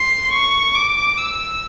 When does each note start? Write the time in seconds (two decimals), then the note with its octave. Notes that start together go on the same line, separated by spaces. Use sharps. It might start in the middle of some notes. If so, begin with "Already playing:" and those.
Already playing: C6
0.33 C#6
0.75 D6
1.17 E6